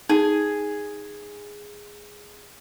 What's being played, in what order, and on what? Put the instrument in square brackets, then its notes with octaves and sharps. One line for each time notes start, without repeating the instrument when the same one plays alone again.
[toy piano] D#4 [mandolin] G#4